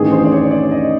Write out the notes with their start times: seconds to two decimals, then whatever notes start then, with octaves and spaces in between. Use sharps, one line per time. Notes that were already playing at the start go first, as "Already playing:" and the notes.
Already playing: A1 G2 D#3 G#4
0.11 C5
0.24 D5
0.32 C#5
0.51 D5
0.71 D#5